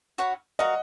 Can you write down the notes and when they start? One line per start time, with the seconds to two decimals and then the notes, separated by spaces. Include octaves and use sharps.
0.18 F#4 C#5 F#5 B5
0.59 F#4 A#4 D#5 F5 F#5